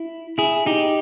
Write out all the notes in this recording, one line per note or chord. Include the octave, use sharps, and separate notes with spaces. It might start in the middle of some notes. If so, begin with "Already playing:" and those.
Already playing: E4
E4 G#4
D#4 G4